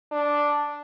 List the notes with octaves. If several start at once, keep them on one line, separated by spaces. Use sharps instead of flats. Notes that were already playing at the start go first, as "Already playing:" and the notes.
D4